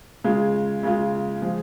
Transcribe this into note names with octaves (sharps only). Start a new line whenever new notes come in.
C#3 G#3 F4
C#3 G#3 F4
F3 G#3